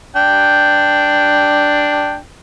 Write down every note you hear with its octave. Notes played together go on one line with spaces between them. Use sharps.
D4 G5